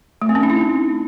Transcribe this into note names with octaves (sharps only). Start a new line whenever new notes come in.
A3
C4
C#4
D#4
E4